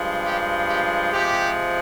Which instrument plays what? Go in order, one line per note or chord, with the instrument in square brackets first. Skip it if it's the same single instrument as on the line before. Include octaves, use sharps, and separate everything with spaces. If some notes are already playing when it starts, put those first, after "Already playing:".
Already playing: [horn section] G2 F3 G#3
G4
G4
C3 F3 G#3 G4